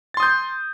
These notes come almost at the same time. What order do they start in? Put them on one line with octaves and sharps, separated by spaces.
A6 C6 D#6 G6